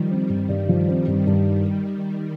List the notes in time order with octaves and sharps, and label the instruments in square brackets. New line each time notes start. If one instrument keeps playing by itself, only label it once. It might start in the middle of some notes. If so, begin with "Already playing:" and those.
Already playing: [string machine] D#3 G3 [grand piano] F3
[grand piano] C4
G2
G2
F3
C4
[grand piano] G2 [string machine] D#3 G3
[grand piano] G2